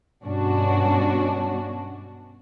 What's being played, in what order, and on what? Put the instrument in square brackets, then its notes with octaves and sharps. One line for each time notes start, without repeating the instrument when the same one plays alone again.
[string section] G2 B2 C#4 D4 F#4